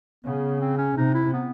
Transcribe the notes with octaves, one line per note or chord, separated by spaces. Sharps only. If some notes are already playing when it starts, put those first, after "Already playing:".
C#3 B3
C4
C#4
C3 D#4
E4
B3